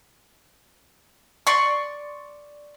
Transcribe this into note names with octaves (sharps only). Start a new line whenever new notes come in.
D5 C6 C#6